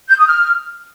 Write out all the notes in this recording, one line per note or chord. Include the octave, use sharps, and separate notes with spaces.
G6
D#6
F6